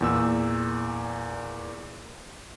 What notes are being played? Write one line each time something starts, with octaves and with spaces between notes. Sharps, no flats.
E2 A#2 E6